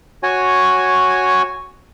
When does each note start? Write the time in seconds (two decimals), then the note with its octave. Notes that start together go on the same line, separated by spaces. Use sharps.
0.23 F#4 C#5 G#5